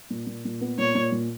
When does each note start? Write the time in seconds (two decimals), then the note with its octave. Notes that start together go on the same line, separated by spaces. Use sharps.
0.10 A#2
0.27 A#2
0.45 A#2
0.61 B3
0.78 A#2 C#5
0.95 A#2
1.12 A#2